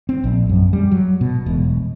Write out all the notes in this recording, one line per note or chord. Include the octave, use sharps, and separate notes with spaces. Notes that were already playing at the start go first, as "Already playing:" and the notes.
C4
A#1
F#2
G3
F#3
B2
E1